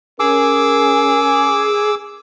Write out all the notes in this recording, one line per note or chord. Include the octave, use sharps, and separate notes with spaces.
C#4 G#4 A#4 D6 E6